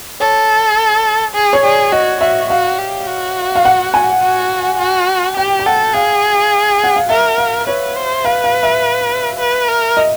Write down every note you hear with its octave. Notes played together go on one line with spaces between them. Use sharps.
A4 C#5
G#4
C#5
G#4 D5
F#4 D#5
F#4 E5
F#4 F5
G4
F#4
F5
F#5
G#5
F#4
F#4
G4 G5
G5
A4 F#5
G#4 F5
F#5
F5
A#4 E5
F5
B4 C#5
C5
B4 F5
F5
E5
B4
A#4
D#5